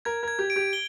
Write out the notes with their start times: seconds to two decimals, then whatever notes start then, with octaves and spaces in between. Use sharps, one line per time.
0.05 A#4 G#6
0.23 A#4 G#6
0.39 G4
0.50 D7
0.56 G4
0.73 G7